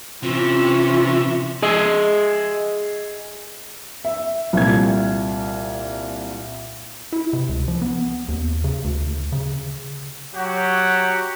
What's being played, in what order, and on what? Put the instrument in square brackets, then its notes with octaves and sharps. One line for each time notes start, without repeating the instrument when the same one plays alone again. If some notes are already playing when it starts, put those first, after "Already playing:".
[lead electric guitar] C3 [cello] E3 C#4 [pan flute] F4
[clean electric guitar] G#4 D#5 E5
[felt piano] E5
C2 A#2 G#6
[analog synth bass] E4
C3
C#2
F3
B3
D#2
C#3
D2
C#3
[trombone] F#3 [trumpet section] F#4 G4 F#5